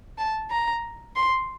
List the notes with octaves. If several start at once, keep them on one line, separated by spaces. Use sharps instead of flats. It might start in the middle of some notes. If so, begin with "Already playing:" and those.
A5
A#5
C6